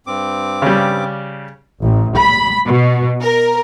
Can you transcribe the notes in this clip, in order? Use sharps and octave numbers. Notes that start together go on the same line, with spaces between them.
G2 C4 D6
C#3 G3
A1
B5
B2
A#4